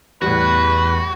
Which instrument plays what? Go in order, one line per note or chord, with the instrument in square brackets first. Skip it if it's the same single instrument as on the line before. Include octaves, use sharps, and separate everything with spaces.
[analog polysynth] E2 [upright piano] A2 G3 [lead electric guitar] F#4 [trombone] B4